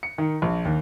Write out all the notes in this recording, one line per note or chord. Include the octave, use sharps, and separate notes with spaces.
C#7
D#3
A#1
D#2